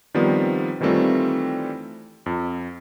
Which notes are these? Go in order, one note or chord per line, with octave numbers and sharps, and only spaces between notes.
D#3 F3 G3 B3 C4
D#3 E3 G3 A3 C4 F4
F2